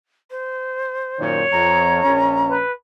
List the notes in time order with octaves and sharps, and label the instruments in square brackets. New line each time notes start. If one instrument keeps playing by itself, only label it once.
[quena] C5
[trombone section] F#2 A#2 D#3 [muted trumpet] C#5
[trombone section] F2 [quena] A#5
[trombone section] A#1 C#4
[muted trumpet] B4